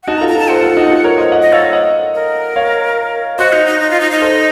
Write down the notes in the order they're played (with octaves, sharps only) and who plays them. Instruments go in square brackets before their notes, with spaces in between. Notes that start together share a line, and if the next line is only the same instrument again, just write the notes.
[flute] F#5
[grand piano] D#4 F#4 [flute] A5
[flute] A#5
[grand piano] F4 A4
[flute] A#5
[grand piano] F4 A4
[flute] A5
[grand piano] A4 C5 [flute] F#5
[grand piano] F4 A4
D#4 F#4
F4 A4
A#4 C#5
C5 D#5
D#5 F#5
[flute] D#5
[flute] A4 [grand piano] C#5 F5
[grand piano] D#5 F#5
[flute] A#4
[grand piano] C#5 F5
[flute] F#4 [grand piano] C5 D#5
[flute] D#4
D#4
D#4
F4
D#4
D#4
[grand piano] A4 C5